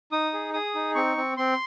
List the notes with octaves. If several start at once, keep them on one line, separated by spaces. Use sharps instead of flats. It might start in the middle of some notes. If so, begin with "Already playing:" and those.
D#4 D#6
G#4
G#4 D#6
D#4
C4 C#6
C4
C4 C6